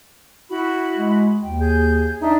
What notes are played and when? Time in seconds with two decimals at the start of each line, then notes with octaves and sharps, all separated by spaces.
0.49 E4 F#4 B5
0.97 G#3
1.42 D#2 G5
1.59 G#4 G6
2.22 D4 D#4 E5